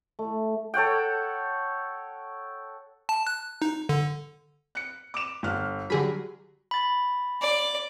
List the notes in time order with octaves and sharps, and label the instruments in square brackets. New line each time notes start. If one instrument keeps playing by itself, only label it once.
[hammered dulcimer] A3
[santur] A4 C#5 F#5 G5
[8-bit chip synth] A5
F#6
D#4
D3
[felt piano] F#6 C#7
D6 E7
G1 F6 F#6
[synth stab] D3 G#4 B5 [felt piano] F#3 G3
[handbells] B5 A6
[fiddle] D5